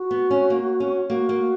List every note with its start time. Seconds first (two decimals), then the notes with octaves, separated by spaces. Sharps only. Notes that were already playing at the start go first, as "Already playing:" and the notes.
Already playing: F#4
0.11 B3
0.31 C#4
0.50 A#3
0.80 C#4
1.09 A#3 F#4
1.29 A#3